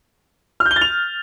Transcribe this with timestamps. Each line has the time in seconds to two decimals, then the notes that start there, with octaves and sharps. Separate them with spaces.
0.60 F6
0.66 G6
0.71 G7
0.76 A6
0.81 F7